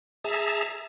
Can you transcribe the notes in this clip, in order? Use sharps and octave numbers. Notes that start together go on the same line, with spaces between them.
G#4 E5 A5 A#5